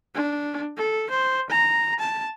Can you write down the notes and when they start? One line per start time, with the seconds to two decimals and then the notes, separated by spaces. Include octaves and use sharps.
0.14 D4
0.77 A4
1.10 C5
1.50 A#5
2.00 A5